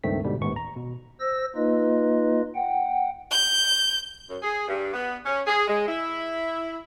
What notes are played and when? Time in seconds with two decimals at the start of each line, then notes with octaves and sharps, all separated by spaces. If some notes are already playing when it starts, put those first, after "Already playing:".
0.04 C#2 G2 D#3 A3 C4 B6
0.24 G#2 B2 D3 G3
0.41 A1 D#2 G#2 B3 C#6
0.56 A#5
0.76 B2
1.20 C5 E6 A#6
1.56 A#3 D#4 F4 B4 D#5
2.55 F#5 G5
3.31 G6
4.29 F#2
4.42 G#4
4.68 G2
4.94 B3
5.25 C#4
5.47 G#4
5.68 G#3
5.88 E4